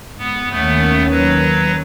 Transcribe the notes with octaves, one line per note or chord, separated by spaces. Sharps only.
G#2 B3
D#2 D#3 A3 B3 C#4
F#3 B4